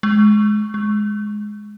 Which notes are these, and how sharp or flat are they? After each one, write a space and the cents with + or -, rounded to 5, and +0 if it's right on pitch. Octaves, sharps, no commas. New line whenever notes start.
G#3 +20
G#3 +10